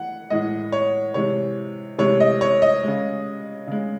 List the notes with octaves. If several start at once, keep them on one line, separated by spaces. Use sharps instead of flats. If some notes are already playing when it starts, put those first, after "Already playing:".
Already playing: E3 F#5
A2 E3 G#3 D#5
C#5
C3 E3 G#3 C#5
C3 E3 G#3 C#5
D#5
C#5
D#5
C#3 G#3
C#3 G#3